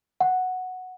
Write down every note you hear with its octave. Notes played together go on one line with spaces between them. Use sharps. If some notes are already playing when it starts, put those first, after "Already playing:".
F#5